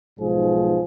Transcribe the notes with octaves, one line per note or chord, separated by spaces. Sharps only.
B1 G#2 F3 G#4